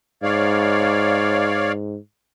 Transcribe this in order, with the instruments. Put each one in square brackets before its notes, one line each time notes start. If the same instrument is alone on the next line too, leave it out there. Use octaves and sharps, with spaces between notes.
[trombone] G#2 [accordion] C#5 D5 F5